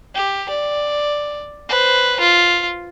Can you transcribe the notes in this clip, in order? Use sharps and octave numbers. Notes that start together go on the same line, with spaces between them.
G4
D5
B4 C5
F4